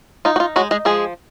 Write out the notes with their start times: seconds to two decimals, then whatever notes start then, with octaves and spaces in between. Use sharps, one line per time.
0.25 D#4 F4
0.36 F#4
0.40 F4
0.56 F#3 G#3 F#4
0.71 G#3 G#4
0.85 F3 G#3 G#4